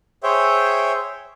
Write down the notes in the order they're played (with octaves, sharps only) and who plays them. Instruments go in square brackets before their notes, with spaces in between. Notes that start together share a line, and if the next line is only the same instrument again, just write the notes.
[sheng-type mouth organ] G#4 C5 C#5 E5 G5